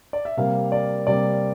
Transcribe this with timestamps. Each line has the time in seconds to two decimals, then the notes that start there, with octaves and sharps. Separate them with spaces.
0.13 D5
0.25 E5
0.37 C3 G3 A#3 F5
0.72 D5
1.07 C3 G3 A#3 D5